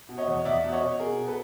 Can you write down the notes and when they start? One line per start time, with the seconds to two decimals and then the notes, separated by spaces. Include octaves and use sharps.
0.09 B2
0.18 C#5 D#5
0.27 E2
0.45 E2 D5 E5
0.64 B2
0.72 C#5 D#5
0.82 B2
0.99 B2 G#4 A#4
1.19 B2
1.27 A4 B4